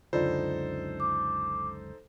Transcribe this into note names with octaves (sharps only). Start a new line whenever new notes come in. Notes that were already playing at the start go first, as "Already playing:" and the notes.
C#2 F#2 D3 D#4 F4 A4 C5 D5
D6